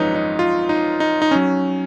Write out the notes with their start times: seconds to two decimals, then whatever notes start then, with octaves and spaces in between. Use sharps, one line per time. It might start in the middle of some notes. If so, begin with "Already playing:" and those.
Already playing: G#1 F#2 F3 G#3 D#4 B4 C#5
0.15 D#4
0.39 F4
0.69 D#4
1.00 D#4
1.22 D#4
1.31 F#3 C#4